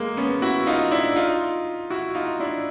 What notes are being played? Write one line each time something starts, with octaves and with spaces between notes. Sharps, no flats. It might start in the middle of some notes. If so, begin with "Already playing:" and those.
Already playing: G#3 A#3
B3 C#4
E4 F#4
D#4 F4
D4 E4
D#4 F4
E4 F#4
D#4 F4
D4 E4